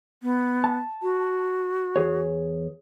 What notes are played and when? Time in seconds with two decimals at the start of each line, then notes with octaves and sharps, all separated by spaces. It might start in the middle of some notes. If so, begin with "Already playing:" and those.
0.23 B3
0.64 A5
1.02 F#4
1.96 E2 G#4 C#5